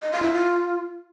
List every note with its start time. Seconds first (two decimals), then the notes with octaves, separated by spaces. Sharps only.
0.02 D#5
0.12 F5
0.22 E4
0.33 F4